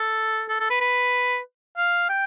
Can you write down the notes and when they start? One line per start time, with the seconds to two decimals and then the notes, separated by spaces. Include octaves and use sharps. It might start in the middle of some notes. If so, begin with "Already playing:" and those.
Already playing: A4
0.49 A4
0.60 A4
0.70 B4
0.81 B4
1.77 F5
2.09 G5